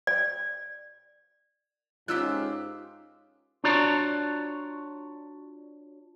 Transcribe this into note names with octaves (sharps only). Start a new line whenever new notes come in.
D5
G#2 C#4 D#4 F4 G4 A#4 E6 F#6
D4 F4 F#4 C#5 D5 A#5